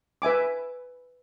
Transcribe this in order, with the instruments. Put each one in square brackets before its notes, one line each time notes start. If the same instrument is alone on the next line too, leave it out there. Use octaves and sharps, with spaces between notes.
[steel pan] B4 E5 G#5 D6